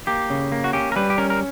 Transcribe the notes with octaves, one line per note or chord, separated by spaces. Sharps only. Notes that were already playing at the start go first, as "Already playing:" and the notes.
A#3 G4
C#3
A#3
F#4
C#4 G4
A#4
G3 B4
G4
C#4 A#4
A#4